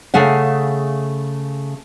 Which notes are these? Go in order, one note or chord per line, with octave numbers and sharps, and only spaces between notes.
C#3 A3 G#4 F5 F#5